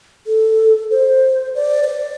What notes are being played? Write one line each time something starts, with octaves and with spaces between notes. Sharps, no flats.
A4
C5
D5
C5
D5